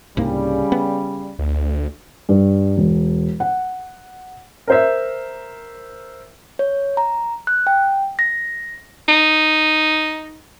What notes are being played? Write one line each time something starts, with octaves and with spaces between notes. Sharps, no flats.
C2 G#2 C#3 G3 A#3
B3
D2
G2
E1
F#5
A#4 C5 E5
C#5
A#5
F#6
G5
A#6
D#4